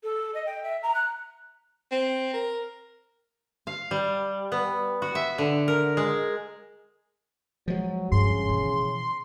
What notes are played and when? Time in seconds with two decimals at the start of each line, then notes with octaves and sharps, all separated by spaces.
0.03 A4
0.34 D#5
0.46 G5
0.63 E5
0.82 A#5
0.94 F#6
1.91 C4
2.33 A#4
3.67 F5
3.91 G3
4.52 B3
5.02 F#4
5.15 E5
5.38 D3
5.68 A#4
5.97 G#3
7.68 F3 F#3 G#3
8.12 G2 C#3 C6
8.49 B2 E3